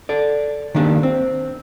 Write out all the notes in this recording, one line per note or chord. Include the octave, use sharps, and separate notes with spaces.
A4 D5
D#3 A#3 D4 G4
C4